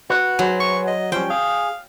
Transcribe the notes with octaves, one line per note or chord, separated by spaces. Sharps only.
F#4 B4 F#5
F#3 G#4 B4 C5
C#6
D#5
F3 G3 C#4 C5 G5
G#4 F5